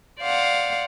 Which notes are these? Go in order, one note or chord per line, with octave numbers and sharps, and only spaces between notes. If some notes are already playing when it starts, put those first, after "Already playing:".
C5 D5 F5 F#5